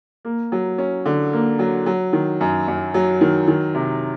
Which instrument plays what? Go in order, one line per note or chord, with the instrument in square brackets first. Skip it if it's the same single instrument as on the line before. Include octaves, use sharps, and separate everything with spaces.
[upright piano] A#3
F#3
C#4
D3
A#3
F#3
F#3
D#3
F#2
F#2
F#3
D#3
D#3
C3